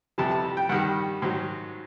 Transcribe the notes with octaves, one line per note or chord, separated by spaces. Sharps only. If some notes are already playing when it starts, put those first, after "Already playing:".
F2 C3 E3 G3 A5
A5
G5
G2 D#3 G3 F#5
G#2 D#3 F#3